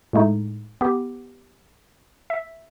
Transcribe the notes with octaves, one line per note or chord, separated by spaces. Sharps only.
A2 G#3 A3 D#4
B3 G4
E5